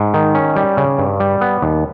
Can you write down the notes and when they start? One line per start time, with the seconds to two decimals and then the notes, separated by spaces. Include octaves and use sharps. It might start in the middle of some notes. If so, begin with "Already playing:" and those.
Already playing: G#2
0.14 D#3
0.35 C#4
0.56 G3
0.77 C#3
0.98 G2
1.20 G3
1.41 B3
1.62 D#2